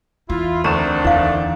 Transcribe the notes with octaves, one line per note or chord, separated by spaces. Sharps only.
E2 E4 F4
D2 D#3 C4 D4 A#5 C#6 E7
E2 E4 F5